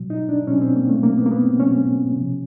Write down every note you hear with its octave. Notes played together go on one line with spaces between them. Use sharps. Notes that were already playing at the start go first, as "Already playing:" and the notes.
Already playing: B2 F#3
D#4
D4
B2 F#3 C#4
C4
A#3
A3
B2 F#3 A#3
B3
A#3
B3
C4
B2 F#3 C#4
C3 F3